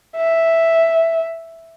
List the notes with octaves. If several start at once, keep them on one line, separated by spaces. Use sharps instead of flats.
E5